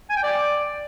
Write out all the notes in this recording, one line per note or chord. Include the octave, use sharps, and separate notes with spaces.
G#5
G5
D5